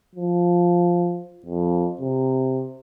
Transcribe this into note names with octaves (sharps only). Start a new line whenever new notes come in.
F3
F2
C3